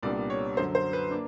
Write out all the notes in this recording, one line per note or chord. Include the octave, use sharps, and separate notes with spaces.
C2 A#2 G3 B3 D4 D5
C#5
F#2 D3 F#3 C5
C5
B4
A#3 D4